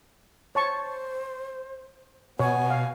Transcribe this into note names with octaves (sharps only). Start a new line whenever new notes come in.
C5 C#5 A5 C#6
B2 B3 C#5 G#5
F5